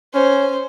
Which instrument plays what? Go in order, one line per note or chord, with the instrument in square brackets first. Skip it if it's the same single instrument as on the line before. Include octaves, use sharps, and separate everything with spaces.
[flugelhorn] C#4 [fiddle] C5